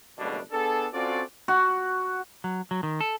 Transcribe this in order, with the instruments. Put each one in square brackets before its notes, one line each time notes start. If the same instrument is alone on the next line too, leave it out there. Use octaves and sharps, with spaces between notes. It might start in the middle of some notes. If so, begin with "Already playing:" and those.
[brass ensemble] F#1 E2 B2 G3 A3 D4
B3 D4 G#4 A4
C4 C#4 F4 F#4 A4 D5
[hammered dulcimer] F#4
[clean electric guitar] F#3
F#3
D#3
A4